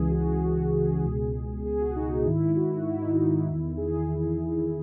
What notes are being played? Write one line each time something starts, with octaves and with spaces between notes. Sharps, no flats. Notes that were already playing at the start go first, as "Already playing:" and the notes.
Already playing: C#2 C#3 E3 G#4
F#4
G#4
F#4
G#4
C#2 B2
G#4
F#4
D#4
G#2 D#3 E4
F#4
E4
D#4
E4
E2 D#3
G#4